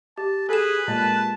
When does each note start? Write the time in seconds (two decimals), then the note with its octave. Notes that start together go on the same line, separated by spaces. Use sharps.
0.18 G4 A5
0.49 G#4 A4 B4 E7
0.88 A#2 G#3 A#3 A5